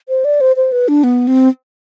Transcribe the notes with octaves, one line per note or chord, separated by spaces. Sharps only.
C5
D5
C5
C5
B4
D4
B3
C4